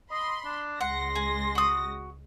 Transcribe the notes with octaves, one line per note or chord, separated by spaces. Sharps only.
D#5 B5 C6
D4
C#2 G#3 F#5 C6 A#6
G#4
F#4 D#6